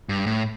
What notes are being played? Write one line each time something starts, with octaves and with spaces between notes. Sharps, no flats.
G2
A2